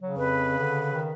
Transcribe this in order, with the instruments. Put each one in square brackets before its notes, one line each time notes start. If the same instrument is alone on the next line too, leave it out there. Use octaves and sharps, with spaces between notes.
[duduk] C#3 [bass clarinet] F#3
[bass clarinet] F2 [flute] B4
[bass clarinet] D3
D#3